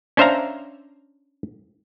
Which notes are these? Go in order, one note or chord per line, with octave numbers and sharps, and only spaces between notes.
C#4 D4 C5 E5 F5 A#5